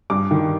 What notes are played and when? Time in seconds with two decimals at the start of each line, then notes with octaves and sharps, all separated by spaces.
0.10 G2 D6
0.31 D#3